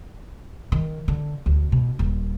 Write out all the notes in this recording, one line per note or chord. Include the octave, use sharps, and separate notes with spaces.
D#3
D3
D2
B2
D#1